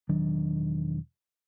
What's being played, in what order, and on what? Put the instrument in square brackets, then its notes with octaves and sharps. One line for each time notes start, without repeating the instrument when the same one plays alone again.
[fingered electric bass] E1 D#3 F#3 D4